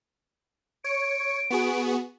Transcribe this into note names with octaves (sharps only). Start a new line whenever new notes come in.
C#5 C#7 D7
B3 F#4 G#4